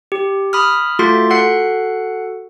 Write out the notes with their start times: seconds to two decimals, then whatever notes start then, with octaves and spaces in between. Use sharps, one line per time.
0.12 G4
0.53 B5 D#6 F6
0.99 A3 F4 F#4 A4 C6 A6
1.30 F#4 A4 F#5 F#6 C7